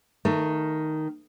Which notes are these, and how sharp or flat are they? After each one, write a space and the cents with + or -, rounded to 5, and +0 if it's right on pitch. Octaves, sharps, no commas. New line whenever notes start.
D#3 +0 A3 +15